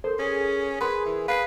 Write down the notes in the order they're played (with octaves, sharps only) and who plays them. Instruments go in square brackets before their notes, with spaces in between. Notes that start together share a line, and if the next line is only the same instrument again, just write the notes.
[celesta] A4 A#4 [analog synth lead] C5
[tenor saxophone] C#4 [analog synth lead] G#4
[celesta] A#4 C6 [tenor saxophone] B4
[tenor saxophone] E3
[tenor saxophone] B4 [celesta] F5 C7